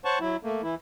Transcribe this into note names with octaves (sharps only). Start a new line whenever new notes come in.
C5 C#5 F#5 A5 C#6
F#3 E4
A3 A#3
E3 E4